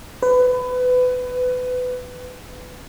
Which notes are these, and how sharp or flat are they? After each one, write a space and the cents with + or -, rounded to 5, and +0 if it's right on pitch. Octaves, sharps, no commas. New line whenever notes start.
B4 +25